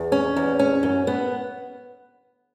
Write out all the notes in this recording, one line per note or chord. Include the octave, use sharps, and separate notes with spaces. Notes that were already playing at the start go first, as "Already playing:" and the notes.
Already playing: E2
C#4
E2
C#4
F#2
B3